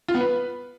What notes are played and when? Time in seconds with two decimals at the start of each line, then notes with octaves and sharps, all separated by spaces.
0.08 F4
0.15 B3
0.21 B4